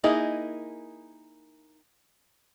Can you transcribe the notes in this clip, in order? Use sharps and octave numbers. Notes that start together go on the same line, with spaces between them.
A#3 D#4 E4 G#4 D#5